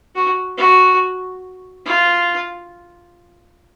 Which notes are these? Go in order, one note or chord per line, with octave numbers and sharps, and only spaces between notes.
F#4
F#4
F4